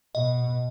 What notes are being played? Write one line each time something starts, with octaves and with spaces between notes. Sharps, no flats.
B2 D#5